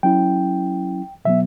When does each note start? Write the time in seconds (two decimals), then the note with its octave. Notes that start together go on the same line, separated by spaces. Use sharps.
0.03 F#3 C#4 E4 G5
1.25 B2 F#3 B3 E5